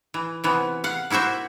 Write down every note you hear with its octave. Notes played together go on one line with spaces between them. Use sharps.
E3
C3 E3 B3
F5 F#5
A#3 E4 F#4 C5 E5